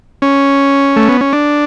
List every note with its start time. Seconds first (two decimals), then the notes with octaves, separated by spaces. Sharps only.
0.22 C#4
0.96 A3
1.09 B3
1.21 C#4
1.33 D4